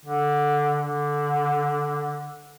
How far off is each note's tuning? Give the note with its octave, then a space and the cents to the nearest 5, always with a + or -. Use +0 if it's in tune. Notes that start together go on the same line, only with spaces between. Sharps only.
D3 +0
D3 -5